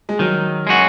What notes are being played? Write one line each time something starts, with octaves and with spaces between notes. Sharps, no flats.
G#3
D#3 F#3
G#3 C#4 F#4